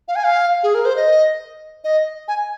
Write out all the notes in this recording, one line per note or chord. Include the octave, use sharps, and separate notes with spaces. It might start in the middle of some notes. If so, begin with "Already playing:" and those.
F5
G#5
F5
G#4
A#4
C5
D#5
D#5
G#5